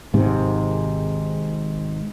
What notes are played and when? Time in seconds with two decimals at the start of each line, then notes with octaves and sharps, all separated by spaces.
0.14 G#1 G#2 C3